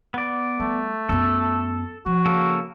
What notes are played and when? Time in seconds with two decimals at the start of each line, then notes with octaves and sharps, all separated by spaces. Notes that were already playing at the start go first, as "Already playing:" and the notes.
0.14 B3 D5
0.60 G3 A3
1.09 F#2 B3 A4
2.06 F3 F#4
2.26 C#3 A#3 A4